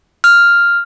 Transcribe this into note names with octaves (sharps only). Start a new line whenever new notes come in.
F6